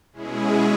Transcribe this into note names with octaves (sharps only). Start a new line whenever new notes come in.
B2 G#3 C#4 E4 G#4